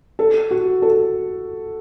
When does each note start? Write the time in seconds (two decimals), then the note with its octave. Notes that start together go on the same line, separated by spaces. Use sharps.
0.19 A4
0.51 F#4
0.82 A4